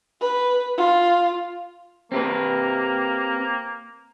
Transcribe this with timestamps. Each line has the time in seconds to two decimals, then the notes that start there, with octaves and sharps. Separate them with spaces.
0.21 B4
0.78 F4
2.12 A#3 C4 G4 B4